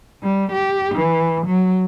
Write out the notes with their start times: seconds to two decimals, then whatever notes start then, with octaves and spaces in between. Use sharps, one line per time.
0.24 G3
0.52 G4
0.95 E3
1.47 F#3